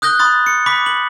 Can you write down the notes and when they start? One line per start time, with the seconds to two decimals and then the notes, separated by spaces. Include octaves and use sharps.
0.02 D#6 F#6 G6 A#6 G7
0.19 B5 C6 D#6 A6
0.46 C#7
0.66 B5 D6 B6
0.86 F#7